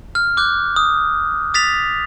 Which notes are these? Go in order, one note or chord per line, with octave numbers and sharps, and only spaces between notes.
F6
D6 F#6 G6
D#6
D#6 A6 B6 F7